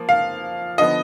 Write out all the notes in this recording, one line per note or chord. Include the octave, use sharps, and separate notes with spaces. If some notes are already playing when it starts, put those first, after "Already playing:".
Already playing: F3 A#3
F5
D3 F3 B3 D#5